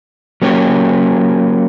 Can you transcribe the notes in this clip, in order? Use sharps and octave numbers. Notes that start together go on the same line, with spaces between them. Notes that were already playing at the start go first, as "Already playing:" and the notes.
F#3 A#3 C#4 G4